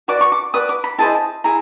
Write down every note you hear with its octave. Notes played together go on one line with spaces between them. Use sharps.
F#4 B4 D5 D6
C#6
D6
F#4 B4 D5 D#6
D6
B5
E4 G#4 C5 D#5 A5
E4 G#4 A#5